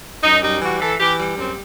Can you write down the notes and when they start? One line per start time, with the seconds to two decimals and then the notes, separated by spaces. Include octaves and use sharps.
0.24 F#2 D#4
0.42 G3 D#4
0.62 E3 F#4
0.81 E3 A4
0.99 E3 G4
1.19 G3
1.37 F#2 C4